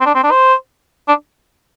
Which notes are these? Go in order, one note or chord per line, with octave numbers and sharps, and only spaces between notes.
C4
D4
C4
D4
C5
D4